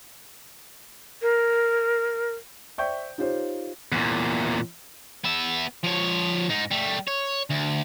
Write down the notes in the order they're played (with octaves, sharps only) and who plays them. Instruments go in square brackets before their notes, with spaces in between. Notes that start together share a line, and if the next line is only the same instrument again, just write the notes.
[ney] A#4
[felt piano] C5 D5 E5 G5 C#6 G6
D#4 F4 G4 C5 C#5
[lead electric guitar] E2 A#2
[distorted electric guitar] B3 E5
F3 C#5
G#2 D#4
G3 A3
C#5
D2